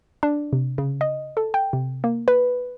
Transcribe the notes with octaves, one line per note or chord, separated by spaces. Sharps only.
D4
C3
C#3
D#5
A4
G5
C3
A#3
B4